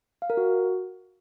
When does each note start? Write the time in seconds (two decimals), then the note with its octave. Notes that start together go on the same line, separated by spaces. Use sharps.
0.22 F5
0.30 A#4
0.37 F#4